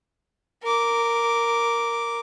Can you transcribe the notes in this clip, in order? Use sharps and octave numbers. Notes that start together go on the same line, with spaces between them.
A#4 D6